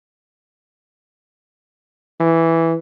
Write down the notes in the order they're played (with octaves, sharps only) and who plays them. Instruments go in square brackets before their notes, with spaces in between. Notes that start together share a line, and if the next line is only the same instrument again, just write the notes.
[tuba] E3